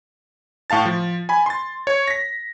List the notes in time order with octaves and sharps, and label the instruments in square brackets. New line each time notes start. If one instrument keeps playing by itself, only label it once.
[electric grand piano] A2 F5 A5 A6
F3
G#5 B5
C6 A6
C#5
A#6 B6